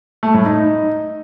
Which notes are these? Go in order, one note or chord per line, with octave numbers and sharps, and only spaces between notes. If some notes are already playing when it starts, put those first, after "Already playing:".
A3
A2
D#4